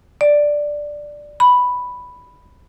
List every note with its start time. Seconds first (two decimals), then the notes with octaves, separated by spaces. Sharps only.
0.21 D5
1.40 B5